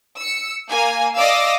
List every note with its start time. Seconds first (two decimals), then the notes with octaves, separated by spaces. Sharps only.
0.18 E6 C#7
0.70 A#3 G#5
1.16 D5 D#5 F5 D6 E6